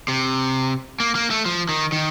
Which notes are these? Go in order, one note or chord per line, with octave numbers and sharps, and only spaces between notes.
C3
A#3
A#3
A3
F3
D#3
D#3